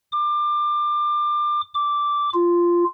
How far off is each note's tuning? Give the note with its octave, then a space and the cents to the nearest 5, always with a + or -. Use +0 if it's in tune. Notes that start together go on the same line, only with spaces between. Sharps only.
D6 +25
D6 -5
F4 -10